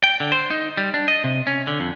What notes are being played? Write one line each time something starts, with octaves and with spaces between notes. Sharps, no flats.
G5
D3
C5
D#4
G3
D4
D#5
C3
C#4
D3
F2